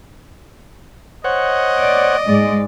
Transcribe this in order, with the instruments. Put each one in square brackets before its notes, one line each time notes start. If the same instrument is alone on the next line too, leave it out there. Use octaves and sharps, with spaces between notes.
[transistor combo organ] C5 C#5 F#5 [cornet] D#5
[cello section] D5
G#2 G#3 D5